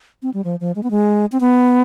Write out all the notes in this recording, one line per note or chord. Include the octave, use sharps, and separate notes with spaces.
C4
G3
F3
F3
G#3
B3
G#3
C4
B3